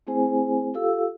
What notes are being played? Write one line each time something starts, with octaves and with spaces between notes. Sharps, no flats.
A3 C4 E4 G#4 C5 G#5
F4 G4 A4 F5 E6